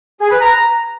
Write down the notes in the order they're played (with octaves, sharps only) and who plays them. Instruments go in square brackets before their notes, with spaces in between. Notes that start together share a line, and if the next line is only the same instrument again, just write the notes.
[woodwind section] G#4
B4
A#5